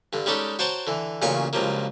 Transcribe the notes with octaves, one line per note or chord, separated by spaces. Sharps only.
G2 D3
G3 G#3 C#4 D#4 G4 A4
F#4 C5 C#5 G5 A5 A#5
D3 E3
A1 A#2 C#3 F#3 G#5 C#6
C#2 G2 F3 F#3 A#3